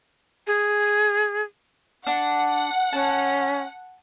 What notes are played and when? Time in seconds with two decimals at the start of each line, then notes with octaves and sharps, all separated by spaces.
0.47 G#4
2.07 D4 F#5
2.93 C#4 A5